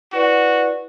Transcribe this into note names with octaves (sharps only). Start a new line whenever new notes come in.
E4 F#4 B4 D5